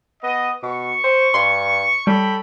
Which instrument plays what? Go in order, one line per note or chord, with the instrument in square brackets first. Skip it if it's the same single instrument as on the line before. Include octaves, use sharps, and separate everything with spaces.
[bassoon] B3 [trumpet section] D#5
[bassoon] B2 [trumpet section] C#6
[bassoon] C5
[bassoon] G2 [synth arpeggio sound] C6
[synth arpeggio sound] G3 [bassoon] A4 [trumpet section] C#5 G5 B5